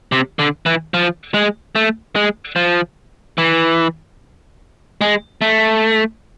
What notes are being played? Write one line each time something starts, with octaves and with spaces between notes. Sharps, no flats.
C3
D3
E3
F3
G#3
A3
G#3
F3
E3
G#3
A3